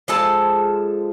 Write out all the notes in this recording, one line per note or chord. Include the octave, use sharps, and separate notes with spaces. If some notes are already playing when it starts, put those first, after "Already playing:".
F3 G#3 A4 A5